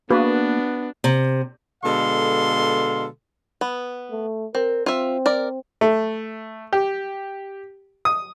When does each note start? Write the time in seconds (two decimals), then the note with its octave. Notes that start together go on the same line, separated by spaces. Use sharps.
0.10 A#3 B3 D4 F#4 G#4 B4
1.04 C3
1.84 B2 D3 G#3 A4 F5 C6
3.61 B3
4.11 A3
4.55 C4 A#4
4.86 C4 F4 E5
5.26 A#4 D5
5.81 A3
6.73 G4
8.05 D#6